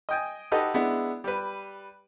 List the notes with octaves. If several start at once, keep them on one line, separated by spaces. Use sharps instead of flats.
D#5 G5 G#5
D#4 F#4 G4 A4 B4 D#5
G#3 B3 D4 E4
G3 B4